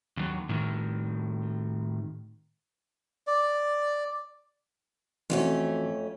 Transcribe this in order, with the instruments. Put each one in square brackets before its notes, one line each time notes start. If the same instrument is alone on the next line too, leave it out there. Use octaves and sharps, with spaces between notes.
[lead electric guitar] D#2 F#3
A2 D#3
[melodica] D5
[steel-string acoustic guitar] F2 A3 C#4 [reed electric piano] E3 C4 F#4